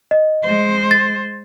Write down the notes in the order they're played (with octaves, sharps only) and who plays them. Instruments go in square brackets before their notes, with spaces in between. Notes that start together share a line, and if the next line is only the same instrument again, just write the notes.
[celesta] D#5
[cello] G#3 C5
[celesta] A6